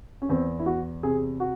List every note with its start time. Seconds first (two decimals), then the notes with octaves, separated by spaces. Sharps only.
0.22 C#4
0.29 E2 C4
0.59 E4
0.66 E2 F#4
1.03 C3 G#4
1.40 F#4